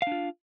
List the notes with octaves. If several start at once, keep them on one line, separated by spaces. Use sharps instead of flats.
D4 F4 F5